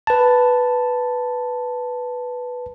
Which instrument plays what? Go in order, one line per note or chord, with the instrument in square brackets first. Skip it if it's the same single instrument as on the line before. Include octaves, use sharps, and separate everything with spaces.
[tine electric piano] B4 A5